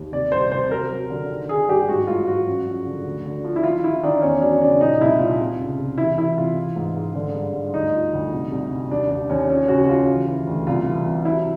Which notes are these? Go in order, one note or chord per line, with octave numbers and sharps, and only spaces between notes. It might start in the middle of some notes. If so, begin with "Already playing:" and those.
Already playing: D#2
C3 D5
C2 C5
C3 C5
F#3 A#4
F#3
D3
D#3
D#3 G#4
G2 G4
G#2 F#4
G#2 F4
G#2 F#4
F#2
F3
D3
D2
D3
F3
E4
D#3 F4
D#3 E4
D#3 D4
E2 C#4
F#3 D4
C#3 D4
A#2 D#4
C2 E4
A#2 F4
C3
C#2
C3
E3 E4
E3 E4
C3 F4
E3
G#2
G#2
D3
G2
G2
D2 D#4
F3
D2
C2
C2
C2
D#2 D4
D#2 D4
D#2 C#4
F3 C#4
C#2 F#4
F#4
C#3 F4
E3
E3
D2
C2 F4
E3
C3
F#3 E4